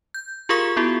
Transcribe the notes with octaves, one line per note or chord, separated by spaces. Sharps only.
G6
F4 G4 G#4 A#4 F5 C#6
B3 E4 F#4 G#4